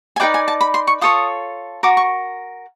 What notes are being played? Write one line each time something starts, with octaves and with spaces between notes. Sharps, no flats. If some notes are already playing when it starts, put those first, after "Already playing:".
G#5
D#4 G#4 B4 D5 G5
G#5
A5
B5
C6
C#6
F4 A4 C#5 D#6
F#4 A#4 D6
C#6